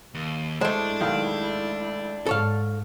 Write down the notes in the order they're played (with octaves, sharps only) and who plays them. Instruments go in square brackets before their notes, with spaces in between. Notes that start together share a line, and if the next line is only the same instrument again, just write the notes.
[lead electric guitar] D#2
[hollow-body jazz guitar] G#3 A3 [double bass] E4 [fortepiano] C5 [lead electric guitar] D5 A5
[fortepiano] B1 D#3 F5
[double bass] G#2 [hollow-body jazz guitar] A4 C#5 F5